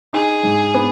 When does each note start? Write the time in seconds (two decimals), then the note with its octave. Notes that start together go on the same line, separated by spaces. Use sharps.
0.13 D#4 G#4
0.43 G#2
0.74 B3